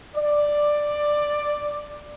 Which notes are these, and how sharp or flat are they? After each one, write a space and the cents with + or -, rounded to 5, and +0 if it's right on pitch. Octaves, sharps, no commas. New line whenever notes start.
D5 +10